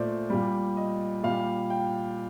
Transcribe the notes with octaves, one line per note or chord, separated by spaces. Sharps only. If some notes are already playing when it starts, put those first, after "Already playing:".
Already playing: A#2 A3 C5 D5
A#2 G3
D#5
A#2 G3 F5
G5